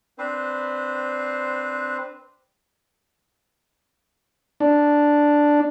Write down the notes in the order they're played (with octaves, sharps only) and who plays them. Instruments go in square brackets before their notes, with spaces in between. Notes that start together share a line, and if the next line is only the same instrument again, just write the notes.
[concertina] C4 D4 B4 C5
[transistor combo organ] D4